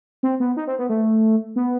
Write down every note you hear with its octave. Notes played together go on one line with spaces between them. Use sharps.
C4
B3
D#4
C4
B3
A3
B3